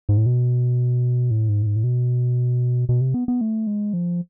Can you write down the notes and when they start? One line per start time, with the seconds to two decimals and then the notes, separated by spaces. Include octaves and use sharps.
0.09 G#2
0.17 A2
0.26 B2
1.31 A2
1.49 G#2
1.62 A2
1.66 G#2
1.76 A2
1.84 B2
2.89 B2
3.01 C3
3.14 B3
3.28 B3
3.41 A3
3.67 G#3
3.93 F3